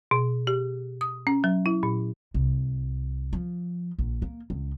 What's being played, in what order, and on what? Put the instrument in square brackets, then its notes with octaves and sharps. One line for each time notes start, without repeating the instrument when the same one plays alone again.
[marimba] B2
G4
D#6
C#4
F#3
E4
A#2
[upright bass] C2
F3
A#1
A#3
C#2